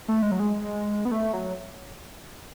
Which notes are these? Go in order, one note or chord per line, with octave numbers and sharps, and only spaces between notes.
A3
G#3
F#3
G#3
B3
A3
F#3